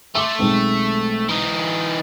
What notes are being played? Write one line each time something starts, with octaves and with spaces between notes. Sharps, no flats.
A3 C6 D6 E6
B1 G#3 C4
E3 D#4